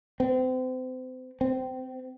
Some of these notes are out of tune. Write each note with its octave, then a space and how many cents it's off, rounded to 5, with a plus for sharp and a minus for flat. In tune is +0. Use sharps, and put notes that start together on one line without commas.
C4 -35
C4 -25